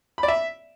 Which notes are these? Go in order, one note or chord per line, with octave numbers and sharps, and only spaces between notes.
B5
D5
E5